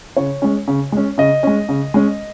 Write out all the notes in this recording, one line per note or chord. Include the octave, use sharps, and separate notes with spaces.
C#3 C#5
G#3 C#4
C#3
G#3 C#4
C#3 D#5
G#3 C#4
C#3
G#3 C#4